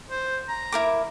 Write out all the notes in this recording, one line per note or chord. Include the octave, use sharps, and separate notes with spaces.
C5
A#5
E4 A#4 D6